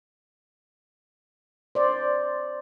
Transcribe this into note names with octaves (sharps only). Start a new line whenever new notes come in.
C5 D5